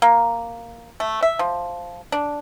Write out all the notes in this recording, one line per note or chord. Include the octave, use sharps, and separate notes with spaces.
A#3
A3
E5
F3
D4